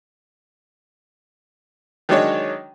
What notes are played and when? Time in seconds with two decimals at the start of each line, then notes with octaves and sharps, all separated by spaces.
2.09 D#3 F#3 G#3 D4 D#4 C#5